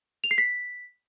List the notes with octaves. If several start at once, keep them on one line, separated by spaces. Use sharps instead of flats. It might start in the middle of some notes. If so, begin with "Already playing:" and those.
F7
C7
B6